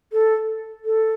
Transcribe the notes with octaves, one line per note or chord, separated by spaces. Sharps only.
A4
A4